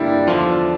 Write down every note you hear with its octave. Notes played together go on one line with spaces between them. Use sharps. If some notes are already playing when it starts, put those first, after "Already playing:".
Already playing: G2 D3 G3 A#3 D4 E4
E2 D3 F3 F4